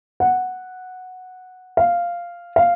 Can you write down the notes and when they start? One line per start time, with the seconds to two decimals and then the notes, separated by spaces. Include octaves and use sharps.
0.20 F#5
1.77 F5
2.56 F5